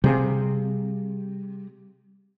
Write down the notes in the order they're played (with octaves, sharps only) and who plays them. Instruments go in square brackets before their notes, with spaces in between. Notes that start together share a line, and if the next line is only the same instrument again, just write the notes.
[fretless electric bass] C3 [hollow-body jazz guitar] G3 G#4 F5